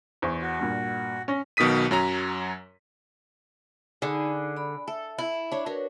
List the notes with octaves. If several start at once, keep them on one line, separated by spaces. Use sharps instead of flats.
E2 C5 C#6
F#4
G2 A#2
C#4 C#6 A#6
B1 B2 D#3 D#6 B6 D#7
F#2 F#3 A#5
D3 D#4 G#4 B5
D5 B5
A4 E5
E4
D4 C#5
D4 F#4 A#4 B4